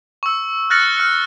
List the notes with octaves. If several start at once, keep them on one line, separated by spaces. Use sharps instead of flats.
C#6 E6
F6 F#6 A6 A#6 C#7 F#7
F6 C#7